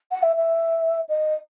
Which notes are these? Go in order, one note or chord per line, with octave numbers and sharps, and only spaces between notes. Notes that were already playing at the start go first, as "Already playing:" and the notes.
F#5
E5
E5
D#5